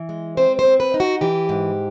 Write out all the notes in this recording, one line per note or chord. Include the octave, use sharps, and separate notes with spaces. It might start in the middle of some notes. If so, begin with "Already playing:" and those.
Already playing: E3
G#3
C4 C5
C5
C4
B4
D#4
F#4
E3 G4
G#2